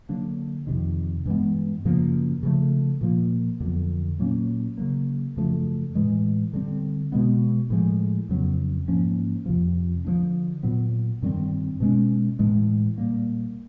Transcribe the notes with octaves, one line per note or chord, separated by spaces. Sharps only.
D3 F#3 A#3 D4
F2 C3 D#3
G2 E3 G#3 B3
F#2 C#3 F3 A#3
C#3 F3 A3
A#2 F3 A#3
F2 D3 F#3 B3
A#2 F#3 A#3 C#4
C#3 F#3 A#3
F#2 C#3 F3 A3
A2 E3 G#3
D3 G3 C4
B2 G#3 B3
A2 F3 G#3
F2 C#3 F#3 B3
G#2 F3 A#3 C#4
F2 C3 F3
D3 F3 A#3 D4
A#2 F#3 B3
G2 D#3 G3 C4
B2 G#3 C#4
A2 E3 G#3
A#2 G3 A#3